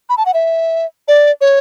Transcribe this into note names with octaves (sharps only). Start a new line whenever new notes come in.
B5
A5
F#5
E5
D5
C#5